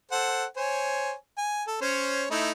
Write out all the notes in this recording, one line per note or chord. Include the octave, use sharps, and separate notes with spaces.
A4 C5 F#5
C5 C#5 G#5
G#5
A4
C#4 C5 C#5
A3 D#4 E4